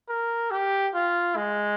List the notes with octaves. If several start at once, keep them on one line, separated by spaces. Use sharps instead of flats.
A#4
G4
F4
G#3